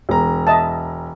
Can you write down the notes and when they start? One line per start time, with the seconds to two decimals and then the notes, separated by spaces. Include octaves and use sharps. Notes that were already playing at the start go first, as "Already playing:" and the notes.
0.09 E1 A#5
0.47 D#5 E5 A5